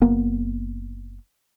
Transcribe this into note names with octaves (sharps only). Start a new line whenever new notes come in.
F#1 A#3 B3